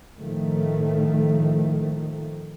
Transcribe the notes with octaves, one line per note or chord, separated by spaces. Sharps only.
A2 D#3 F3 A3